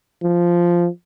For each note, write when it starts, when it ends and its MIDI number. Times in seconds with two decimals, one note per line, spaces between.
0.23 0.88 53